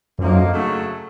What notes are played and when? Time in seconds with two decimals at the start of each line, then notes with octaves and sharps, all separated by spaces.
0.19 F#2 D3 F3 A#3 D#4
0.53 C#3 F#3 A3